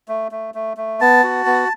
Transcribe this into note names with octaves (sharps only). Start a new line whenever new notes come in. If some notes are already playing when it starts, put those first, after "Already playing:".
A3
A3
A3
A3
B3 A5
F#4
B3